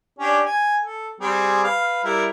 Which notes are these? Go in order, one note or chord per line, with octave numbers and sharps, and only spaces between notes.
C#4 D4 G4
G#5
A4
G3 C4 G#4
B4 F5
G3 E4 A#4